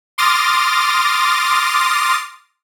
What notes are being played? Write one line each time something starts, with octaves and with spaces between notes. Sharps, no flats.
C6 D6 D#6 F6 A6 A#6